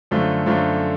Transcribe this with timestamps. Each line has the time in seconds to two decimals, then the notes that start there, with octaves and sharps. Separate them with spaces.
0.11 F#2 D3 F3 A3 F4
0.46 F#2 D3 F3 A3 F4